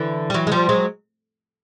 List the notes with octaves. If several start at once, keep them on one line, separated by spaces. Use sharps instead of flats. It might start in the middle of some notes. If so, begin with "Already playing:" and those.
Already playing: D3 E3
G3
E3 F#3
G#3
F3 G3
F#3 G#3